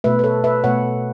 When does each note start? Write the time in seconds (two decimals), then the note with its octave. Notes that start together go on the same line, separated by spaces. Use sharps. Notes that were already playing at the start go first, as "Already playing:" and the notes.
0.04 B2 A3 B4 E5
0.19 B4
0.24 A4 C#5
0.44 B4 E5
0.64 B2 A3 C#5 F#5